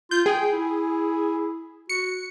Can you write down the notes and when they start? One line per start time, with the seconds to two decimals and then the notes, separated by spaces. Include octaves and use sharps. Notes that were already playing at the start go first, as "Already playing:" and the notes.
0.11 F4 G6
0.26 G#4 G5
0.52 E4
1.89 F#4 C#7